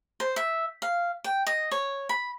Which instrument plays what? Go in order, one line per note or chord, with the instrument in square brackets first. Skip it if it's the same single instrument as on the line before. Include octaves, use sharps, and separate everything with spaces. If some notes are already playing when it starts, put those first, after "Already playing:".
[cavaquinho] C5
E5
F5
G5
D#5
C#5
B5